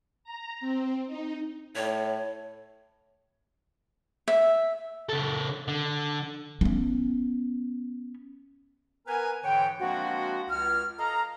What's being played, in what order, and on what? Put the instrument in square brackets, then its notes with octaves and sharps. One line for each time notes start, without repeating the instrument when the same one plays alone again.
[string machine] A#5
C4
D#4
[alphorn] A2 [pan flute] C#5
[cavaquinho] E5
[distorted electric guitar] C#3 A4
D3
[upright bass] B3 C#4
[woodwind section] B3 A#4 B4 G#5
G#2 D3 E3 C#5 F#5 G5
F3 G#3 A#3 C4 D4 F#4
C#2 F6
A4 D#5 F5 A#5